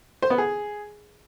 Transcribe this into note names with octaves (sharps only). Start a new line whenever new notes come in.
C5
B3
G#4